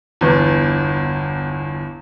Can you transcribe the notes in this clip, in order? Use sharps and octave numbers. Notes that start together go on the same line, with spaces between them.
G1 E2